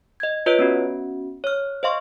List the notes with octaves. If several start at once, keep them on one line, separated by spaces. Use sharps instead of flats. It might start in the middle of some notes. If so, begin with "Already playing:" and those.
D#5 G#6
F4 B4 C#5 D#5 G6 D7
B3 C#4 F#4
C#5 F6
C5 D#5 F5 C6 C#6